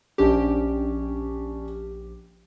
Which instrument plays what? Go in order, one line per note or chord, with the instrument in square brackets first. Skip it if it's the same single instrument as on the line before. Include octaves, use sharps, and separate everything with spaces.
[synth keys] A#1 G4 [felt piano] C#4 D4